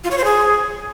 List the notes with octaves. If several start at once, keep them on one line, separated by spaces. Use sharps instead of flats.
F4
C#5
C5
G#4